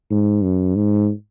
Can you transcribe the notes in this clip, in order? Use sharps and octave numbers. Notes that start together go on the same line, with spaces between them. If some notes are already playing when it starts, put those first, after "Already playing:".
G#2
F#2
G#2